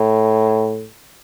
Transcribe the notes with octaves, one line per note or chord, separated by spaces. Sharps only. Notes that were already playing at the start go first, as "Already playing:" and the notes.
Already playing: A2